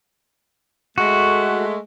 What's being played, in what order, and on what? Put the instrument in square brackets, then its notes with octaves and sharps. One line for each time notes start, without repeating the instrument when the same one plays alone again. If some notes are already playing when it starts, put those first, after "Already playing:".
[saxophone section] G#3 A3 [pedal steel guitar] F#4